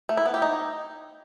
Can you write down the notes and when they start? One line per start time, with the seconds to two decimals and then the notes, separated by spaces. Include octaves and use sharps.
0.09 A3
0.17 E4
0.26 B3
0.34 G4
0.42 D#4